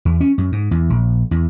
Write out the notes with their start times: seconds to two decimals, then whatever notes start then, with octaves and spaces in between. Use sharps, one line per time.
0.05 E2
0.21 C#4
0.38 F#2
0.52 G#2
0.71 E2
0.90 A#1
1.31 E2